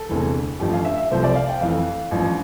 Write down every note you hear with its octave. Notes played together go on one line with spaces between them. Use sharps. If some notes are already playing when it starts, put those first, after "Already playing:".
Already playing: A4
E1 D2 C3 E3
A1 G2 F3 A3 G4
F5
E5
E5
C2 C3 F3 A3 C5
D5
F5
G5
F2 E3 A3 F5
A1 G2 F3